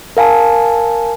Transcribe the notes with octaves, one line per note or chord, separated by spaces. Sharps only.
A#4 F5 G#5 A5